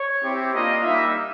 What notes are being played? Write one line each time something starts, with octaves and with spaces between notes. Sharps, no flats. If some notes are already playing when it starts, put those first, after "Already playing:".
Already playing: C#5
C4 E4 G4
A#3 D4 F4 D#5
G3 A#3 D#4 E5